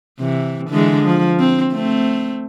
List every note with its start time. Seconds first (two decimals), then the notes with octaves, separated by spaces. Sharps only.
0.19 C3 E3
0.70 D3 E3 G#3
1.04 F3
1.40 C4
1.73 A3 C4